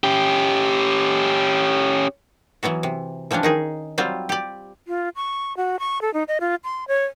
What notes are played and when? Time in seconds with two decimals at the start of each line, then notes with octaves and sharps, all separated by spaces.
0.04 C#4 G4
2.63 E3 F#3 B3 F#4
2.83 C3
3.31 E3 F3 G3 C#4 D4
3.43 D#3 D#4 G#4
3.98 F#3 G3 C4 F4
4.29 G4 D5
4.88 F4
5.16 C#6
5.57 F#4
5.79 C#6
6.02 A4
6.14 D#4
6.28 D#5
6.41 F4
6.64 C6
6.88 C#5